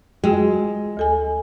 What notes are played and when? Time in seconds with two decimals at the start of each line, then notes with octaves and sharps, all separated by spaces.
0.24 G#3 F4 F#4 G5
0.97 D2 A4 G#5